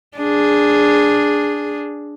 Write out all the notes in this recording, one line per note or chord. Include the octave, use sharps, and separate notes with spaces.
D4 G#4